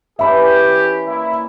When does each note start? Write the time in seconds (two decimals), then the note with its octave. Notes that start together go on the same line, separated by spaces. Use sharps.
0.19 E3 C#4 G4 D5 E5 B5
1.07 A#3 E4